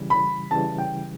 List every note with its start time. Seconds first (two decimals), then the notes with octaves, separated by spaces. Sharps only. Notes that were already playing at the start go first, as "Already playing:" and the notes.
Already playing: C#3 E3 G3
0.10 B5
0.51 C#3 E3 G3 A5
0.78 G5